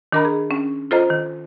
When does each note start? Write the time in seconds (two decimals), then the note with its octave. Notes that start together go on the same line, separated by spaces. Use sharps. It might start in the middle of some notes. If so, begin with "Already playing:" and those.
0.12 D#3 D4 A#4 D#5 A#5 B5
0.25 G#4
0.51 C#4
0.91 F4 A4 C5 D#5 A#5 F6
1.10 D#3